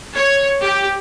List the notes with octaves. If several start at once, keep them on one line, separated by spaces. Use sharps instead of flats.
C#5
G4